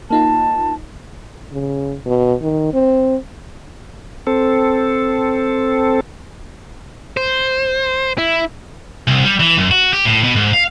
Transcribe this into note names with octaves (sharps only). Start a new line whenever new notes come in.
A#3 D#4 F4 A5
C#3
B2
D#3
C4
C4 A4
C5
E4
C2
G3
E3
F#2
F#4
G4
A2
B2
G#2
F5